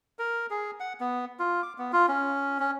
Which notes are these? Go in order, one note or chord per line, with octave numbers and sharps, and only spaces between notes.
A#4
G#4
F#5
B3
F4
D6
B3
F4
C#4
C#4